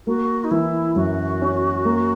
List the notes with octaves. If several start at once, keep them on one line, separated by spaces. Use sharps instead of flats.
A#3 F#4
D#4
E3 E4
F#2 F#4
C#4
A#3